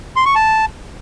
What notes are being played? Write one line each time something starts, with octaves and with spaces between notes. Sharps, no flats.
C6
C#6
A5